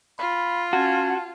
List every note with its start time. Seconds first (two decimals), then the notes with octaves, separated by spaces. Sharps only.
0.19 F4 B5
0.73 C#4 F#4 F#5 A5 G#6